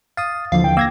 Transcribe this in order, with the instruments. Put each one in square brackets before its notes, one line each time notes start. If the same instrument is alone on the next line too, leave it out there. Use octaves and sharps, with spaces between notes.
[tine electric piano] F5 D#6 [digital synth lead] A6
[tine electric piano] D#2 D3 E3 [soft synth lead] F3 [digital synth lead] F5
[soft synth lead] G5
[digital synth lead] A#3 [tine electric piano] E6 G#6 A#6